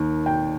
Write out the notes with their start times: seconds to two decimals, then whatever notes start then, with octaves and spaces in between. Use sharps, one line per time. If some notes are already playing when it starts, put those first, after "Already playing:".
Already playing: D#2 D#3
0.26 G5